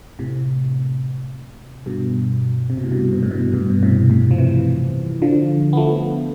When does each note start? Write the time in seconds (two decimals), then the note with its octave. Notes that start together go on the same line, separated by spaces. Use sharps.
0.19 A2 C3
1.86 G2 B2
2.70 C3
2.77 B2
2.84 A2
2.91 G2 B2
3.13 B2
3.23 A2
3.31 G2 B2
3.54 G2 B2
3.70 B2
3.83 A2 C3
4.10 A2 C3
4.31 F3
4.38 C3 E3
5.22 D3 F3
5.73 B3
5.77 F3 A3